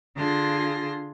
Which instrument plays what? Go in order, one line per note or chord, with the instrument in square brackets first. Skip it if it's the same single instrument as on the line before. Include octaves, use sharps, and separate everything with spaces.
[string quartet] D3 D4 F4 G#4 C6 A#6